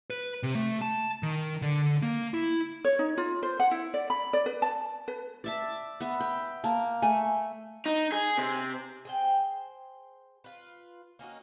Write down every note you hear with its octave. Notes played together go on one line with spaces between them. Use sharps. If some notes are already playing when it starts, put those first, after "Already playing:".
B4
C3
A3
A5
D#3
D3
A#3
E4
C#5
D#4
F4
C5
F#5
E4
D5
B5
D5
B4
A5
B4
D5 E5 A5
B3 E5
G5
A#3 A5
A3 G#5
D#4
G#4
C3
G#4 C5 G5
F4 B4
A#3 C#4 D#4 F#4